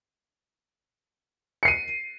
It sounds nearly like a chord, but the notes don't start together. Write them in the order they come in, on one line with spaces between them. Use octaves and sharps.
C#7 C7 D#7